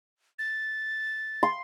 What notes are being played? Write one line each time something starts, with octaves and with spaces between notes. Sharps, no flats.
A6
C6